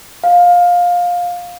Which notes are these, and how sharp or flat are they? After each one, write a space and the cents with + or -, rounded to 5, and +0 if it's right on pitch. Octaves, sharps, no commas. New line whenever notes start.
F5 +20